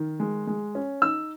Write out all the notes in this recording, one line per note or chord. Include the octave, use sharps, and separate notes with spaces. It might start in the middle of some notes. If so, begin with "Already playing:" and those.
Already playing: D#3
G#3
G#3
C#4
D#4 E6